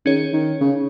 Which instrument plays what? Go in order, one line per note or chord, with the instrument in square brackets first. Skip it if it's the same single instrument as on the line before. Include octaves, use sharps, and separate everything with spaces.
[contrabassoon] D#3 [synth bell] C#4 G#4 C#5
[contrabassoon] D#3
C#3